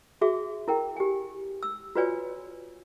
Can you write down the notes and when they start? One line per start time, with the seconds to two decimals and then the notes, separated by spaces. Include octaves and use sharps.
0.21 F#4 G#4 E5 D6
0.68 E4 A#4 G5
0.96 G4 G#5
1.63 E6
1.96 F4 F#4 B4 C#5 D5 G#5